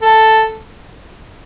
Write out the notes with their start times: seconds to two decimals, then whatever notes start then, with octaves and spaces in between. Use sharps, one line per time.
0.02 A4